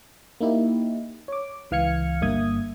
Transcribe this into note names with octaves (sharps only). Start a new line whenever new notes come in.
A#3 D#4 E4 G4
C#5 D6
C#2 E3 F5 F6 G#6 C#7
G1 G2 A#3 E5 D#6 G#6